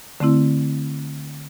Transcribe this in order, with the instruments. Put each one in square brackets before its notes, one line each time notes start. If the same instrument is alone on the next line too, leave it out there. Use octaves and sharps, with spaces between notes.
[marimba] D3 A3 C4 E4